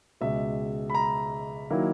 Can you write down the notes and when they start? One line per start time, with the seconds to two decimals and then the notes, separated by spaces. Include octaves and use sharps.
0.21 C#2 B2 G#3 E5
0.90 B5
0.95 A#5
1.70 D#3 F#3 A#3 E4